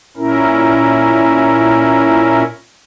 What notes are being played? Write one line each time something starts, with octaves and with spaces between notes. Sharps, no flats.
A#2 C#4 E4 A#4